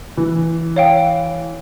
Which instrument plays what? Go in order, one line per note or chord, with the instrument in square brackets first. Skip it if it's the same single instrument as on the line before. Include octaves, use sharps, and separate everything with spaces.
[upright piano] E3
[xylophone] C#5 F5 G5